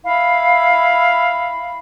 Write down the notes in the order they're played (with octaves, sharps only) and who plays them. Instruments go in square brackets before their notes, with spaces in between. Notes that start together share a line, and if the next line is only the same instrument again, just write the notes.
[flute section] E4 F5 B5